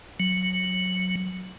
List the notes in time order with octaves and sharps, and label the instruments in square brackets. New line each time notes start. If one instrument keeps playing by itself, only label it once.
[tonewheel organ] F#3